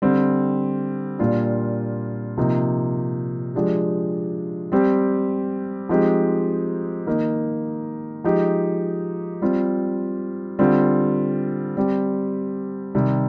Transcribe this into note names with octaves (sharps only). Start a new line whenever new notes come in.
D3 G3 C4
A#2 G3 A#3 D4 F4
C3 F3 A#3 D#4
F3 G#3 D4 G4
G3 C4 G4
F3 G#3 C4 D#4 G4
D#3 A#3 D#4
F3 G#3 D#4 G4
G3 C4 F4
D3 G3 C4 F4
G3 C4 G4
C3 D#3 G3